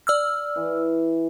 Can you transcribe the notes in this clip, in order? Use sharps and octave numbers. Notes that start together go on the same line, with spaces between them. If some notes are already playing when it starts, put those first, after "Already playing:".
D5 E6 F6
E3